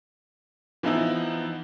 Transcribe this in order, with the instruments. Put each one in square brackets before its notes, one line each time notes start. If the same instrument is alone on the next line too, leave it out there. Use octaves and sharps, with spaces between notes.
[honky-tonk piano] E3 F3 B3 D#4 E4